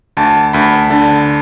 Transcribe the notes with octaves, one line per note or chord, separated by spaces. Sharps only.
D2 A5
D2 B5
D3 A5